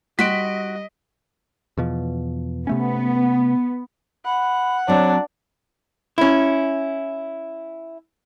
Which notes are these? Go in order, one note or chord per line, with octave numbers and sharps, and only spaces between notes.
G3 F#4 D#5 C6 B6 D7
E2 B2 F3
C3 A3 B3 C#4
F#5 B5
F#3 C4 D4 C#5
C#4 E4